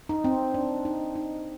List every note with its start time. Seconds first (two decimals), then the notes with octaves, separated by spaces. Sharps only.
0.09 D#4
0.24 C4
0.54 D4
0.85 D#4
1.15 D#4